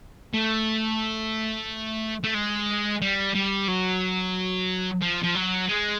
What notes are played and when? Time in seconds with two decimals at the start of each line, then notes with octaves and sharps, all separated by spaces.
0.33 A3
2.24 A3
2.34 G#3
3.02 G3
3.35 G3
3.68 F#3
5.02 F3
5.23 F3
5.35 F#3
5.68 G#3